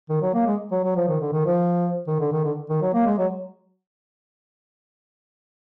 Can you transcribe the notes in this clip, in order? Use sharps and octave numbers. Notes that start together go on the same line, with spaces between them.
D#3
F#3
A#3
G#3
F#3
F#3
F3
D#3
D3
D#3
F3
D#3
D3
D#3
D3
D#3
F#3
A#3
G#3
F#3